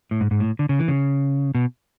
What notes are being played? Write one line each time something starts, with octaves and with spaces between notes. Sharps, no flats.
A2
G#2
G#2
A2
D3
C#3
E3
C#3
B2